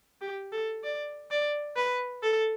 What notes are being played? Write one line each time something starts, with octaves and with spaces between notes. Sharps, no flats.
G4
A4
D5
D5
B4
A4